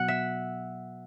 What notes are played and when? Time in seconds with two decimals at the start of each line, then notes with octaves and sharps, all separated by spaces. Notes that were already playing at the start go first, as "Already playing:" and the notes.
Already playing: B2 F#3 F#5
0.08 E5